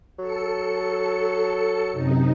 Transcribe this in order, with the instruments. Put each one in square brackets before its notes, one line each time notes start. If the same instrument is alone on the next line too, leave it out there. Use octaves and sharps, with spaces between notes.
[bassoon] F#3 [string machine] A4 C#7
[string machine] F#2 C3 D#4